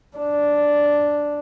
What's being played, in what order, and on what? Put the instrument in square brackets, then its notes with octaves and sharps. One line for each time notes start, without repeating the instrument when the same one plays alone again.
[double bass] D4